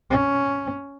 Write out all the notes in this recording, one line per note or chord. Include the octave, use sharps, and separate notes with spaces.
C#4